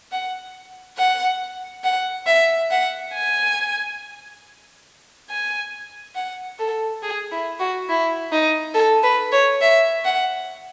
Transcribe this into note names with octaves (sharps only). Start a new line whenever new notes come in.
F#5
F#5
F#5
E5
F#5
G#5
G#5
F#5
A4
G#4
E4
F#4
E4
D#4
A4
B4
C#5
E5
F#5